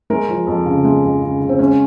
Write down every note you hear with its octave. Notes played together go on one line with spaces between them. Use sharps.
G#3 A#4
F3
F2
C#3
G#3
F2
C#3
C#3
C4
G#3 C#4